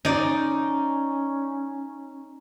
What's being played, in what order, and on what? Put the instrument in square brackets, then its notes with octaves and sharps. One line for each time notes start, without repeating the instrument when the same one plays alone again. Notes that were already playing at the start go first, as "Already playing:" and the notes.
[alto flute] C#4 [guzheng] D#4 D5